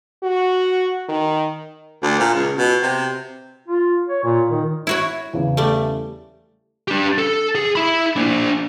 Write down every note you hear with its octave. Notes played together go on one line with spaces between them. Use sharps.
F#4
D#3
D2
A#2
C#2
B2
C3
F4
C#5
A#2
D#3
E4 F#4 C#5
E2 C#3
G3 A3
D4 G4
A4
G#4
E4 B5
A#3 D4